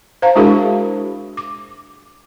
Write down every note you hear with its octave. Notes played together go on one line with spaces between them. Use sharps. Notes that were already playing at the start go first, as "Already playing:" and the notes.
C5 F5 A#5
G#3 D4 E4 F#4 G#4 A#4
D6